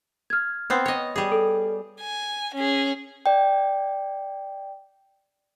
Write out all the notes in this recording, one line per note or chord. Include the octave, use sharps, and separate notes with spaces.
F6 G#6
B3 C4 C5
C#5 D#5
G3 G#4
A4
G#5
C#4 G#4
D5 G5